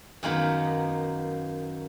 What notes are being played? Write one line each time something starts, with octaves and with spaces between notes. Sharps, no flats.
F#2 D#3 A#3 B3